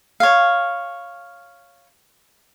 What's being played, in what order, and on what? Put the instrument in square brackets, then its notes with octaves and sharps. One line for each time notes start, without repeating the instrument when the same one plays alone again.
[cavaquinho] C#5 F5